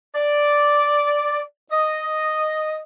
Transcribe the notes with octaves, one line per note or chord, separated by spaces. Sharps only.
D5
D#5